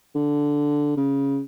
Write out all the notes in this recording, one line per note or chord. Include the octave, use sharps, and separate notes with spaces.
D3
C#3